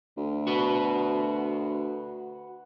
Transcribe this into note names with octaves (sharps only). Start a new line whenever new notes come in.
D2
F#4 B4